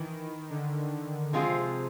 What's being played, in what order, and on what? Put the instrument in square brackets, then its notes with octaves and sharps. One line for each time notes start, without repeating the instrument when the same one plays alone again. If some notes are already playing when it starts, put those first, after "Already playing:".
Already playing: [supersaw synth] D#3 [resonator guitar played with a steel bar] E3
[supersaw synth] D3
D3
[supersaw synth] C3 [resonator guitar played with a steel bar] F3 G#3 C4 F4 G#4